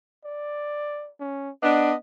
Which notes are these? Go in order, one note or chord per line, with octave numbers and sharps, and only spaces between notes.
D5
C#4
B3 D4 D#5